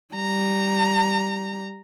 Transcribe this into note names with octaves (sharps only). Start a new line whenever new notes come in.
G3 A#5